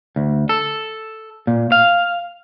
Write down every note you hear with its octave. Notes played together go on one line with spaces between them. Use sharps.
D2
A4
A#2
F5